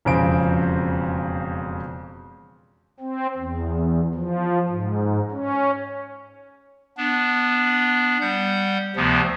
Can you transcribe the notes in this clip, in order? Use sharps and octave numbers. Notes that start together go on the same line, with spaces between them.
E1 F2 C#3 C4 D7
C4
E2
F3
G#2
C#4
B3 D4
G3 F#5 G6
D2 C3 F3 B3